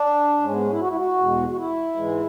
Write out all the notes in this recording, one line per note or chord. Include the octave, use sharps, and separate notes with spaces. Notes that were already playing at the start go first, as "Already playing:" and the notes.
Already playing: D4
G#2 G#3 C#4
B3
C#4
E4
F#4
E4
F#4
E2 B2 G#3
F#4
E4
G#2 E3 G#3